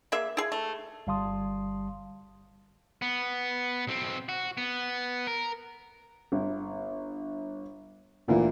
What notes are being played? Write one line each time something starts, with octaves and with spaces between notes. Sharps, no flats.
A#3 G#4 E5
E4 G#4
A3
G1 G3 F5 A5 C6 D#6
B3
B1 C4
F#4
B3
A#4
G1
D2 A#2 E3